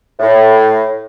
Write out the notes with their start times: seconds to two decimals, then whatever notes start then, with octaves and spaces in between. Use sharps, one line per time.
0.20 A2